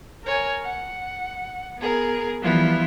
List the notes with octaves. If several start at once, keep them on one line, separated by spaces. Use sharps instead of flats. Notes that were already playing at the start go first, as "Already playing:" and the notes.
A#4 C#5 G#5
F#5
B3 G#4 A#4
E3 F3 G3 B3 E4 F4